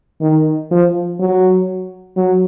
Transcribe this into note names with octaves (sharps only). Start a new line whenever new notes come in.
D#3
F3
F#3
F#3